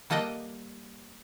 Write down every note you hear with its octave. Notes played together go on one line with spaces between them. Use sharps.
G3 A#3 A4 D#5 F#5 G5